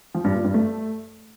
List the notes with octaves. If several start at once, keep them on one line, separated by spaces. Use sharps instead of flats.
F3
G2
A#2
G2
A3